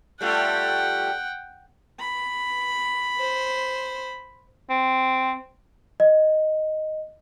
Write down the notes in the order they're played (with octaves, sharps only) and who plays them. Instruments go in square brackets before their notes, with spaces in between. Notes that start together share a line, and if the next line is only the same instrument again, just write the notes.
[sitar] G3 A3 F4 [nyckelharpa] F#5 G5
[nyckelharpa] B5
[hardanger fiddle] C5
[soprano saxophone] C4
[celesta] D#5